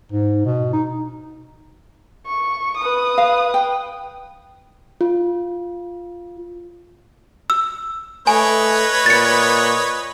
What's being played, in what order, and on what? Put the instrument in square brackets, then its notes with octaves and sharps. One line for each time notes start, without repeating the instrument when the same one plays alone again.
[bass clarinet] G#2
B2
D#4
[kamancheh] C#6
B4 D#6
[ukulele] F5
G5
[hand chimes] F4
[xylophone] E6
[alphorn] A3 [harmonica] B4 C#5 D#5 [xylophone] G#5
[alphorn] A#2 [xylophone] A6 C#7